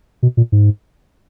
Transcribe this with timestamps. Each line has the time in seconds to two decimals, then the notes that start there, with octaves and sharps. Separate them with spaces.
0.23 B2
0.37 A#2
0.52 G#2